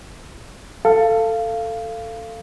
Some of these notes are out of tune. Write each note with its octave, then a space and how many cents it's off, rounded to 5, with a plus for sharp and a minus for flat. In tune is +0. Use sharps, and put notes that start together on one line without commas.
A4 +15 F5 -15